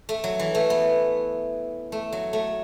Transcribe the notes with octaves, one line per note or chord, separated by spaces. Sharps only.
A3
F#3
E3
A3
B3
A3
F#3
A3